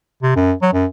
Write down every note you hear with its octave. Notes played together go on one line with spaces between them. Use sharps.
C3
F#2
F#3
F#2